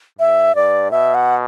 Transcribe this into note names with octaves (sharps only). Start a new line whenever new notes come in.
G2 E5
G2 D5
B2 E5
F#5